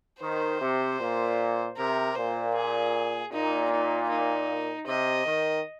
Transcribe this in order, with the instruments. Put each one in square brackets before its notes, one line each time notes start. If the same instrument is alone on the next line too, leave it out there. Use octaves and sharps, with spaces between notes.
[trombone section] D#3 [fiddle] C5
[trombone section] C3
A#2
[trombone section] C3 [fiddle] A#4
[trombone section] A#2 [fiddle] C5
[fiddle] G#4
[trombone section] A#2 [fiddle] D#4
[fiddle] D#4
D#4
[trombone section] C3 [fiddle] D#5
[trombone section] D#3